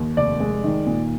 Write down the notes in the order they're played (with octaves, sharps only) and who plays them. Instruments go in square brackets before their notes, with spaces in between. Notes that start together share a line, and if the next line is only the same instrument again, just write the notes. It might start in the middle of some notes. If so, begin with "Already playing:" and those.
Already playing: [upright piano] D#2
F1 D5
G#3
D#3
A#2